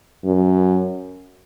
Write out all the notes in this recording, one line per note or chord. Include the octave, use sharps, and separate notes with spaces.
F#2